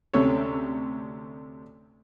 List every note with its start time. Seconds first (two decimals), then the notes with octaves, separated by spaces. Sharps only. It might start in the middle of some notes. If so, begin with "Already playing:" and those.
0.13 D2 C3 C#4 A4 C#5